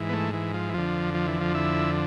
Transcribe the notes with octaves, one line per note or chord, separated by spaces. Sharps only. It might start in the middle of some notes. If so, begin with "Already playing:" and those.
Already playing: G#2 E3
B3
A3
E3
F3
E3
F2 D3 F3
F3
E3
F3
E4